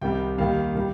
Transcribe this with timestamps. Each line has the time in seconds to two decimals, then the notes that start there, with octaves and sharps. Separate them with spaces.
0.01 C2 C3 D#3 G3 G5
0.38 D#2 D#3 G3 F5
0.75 D#3 G3